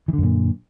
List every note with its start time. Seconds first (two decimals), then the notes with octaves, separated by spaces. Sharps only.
0.08 E3
0.13 D3
0.18 F#2
0.23 A#2